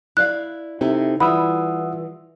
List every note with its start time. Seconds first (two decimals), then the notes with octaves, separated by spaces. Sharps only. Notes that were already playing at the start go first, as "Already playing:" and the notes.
0.17 E4 D5 F5 F#6
0.81 C3 D#4 E4 A4
1.20 E3 G3 E4 F4 F#5 B5 D#6 E6